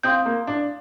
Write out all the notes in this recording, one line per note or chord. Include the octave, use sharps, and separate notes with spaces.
C4 F5 C6 D#6 G6
A#3
D4